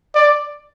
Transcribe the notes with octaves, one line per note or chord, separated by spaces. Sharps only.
D5